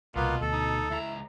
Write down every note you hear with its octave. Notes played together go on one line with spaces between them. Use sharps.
C2 B2 A#3 B3 F4
D2 A4
D#4
C#2 E4 A#5